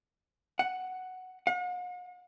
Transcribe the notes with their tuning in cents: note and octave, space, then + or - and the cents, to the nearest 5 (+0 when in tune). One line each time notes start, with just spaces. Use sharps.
F#5 +5
F#5 -45